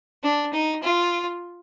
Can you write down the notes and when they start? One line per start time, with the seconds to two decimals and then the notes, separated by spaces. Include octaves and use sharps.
0.23 D4
0.53 D#4
0.83 F4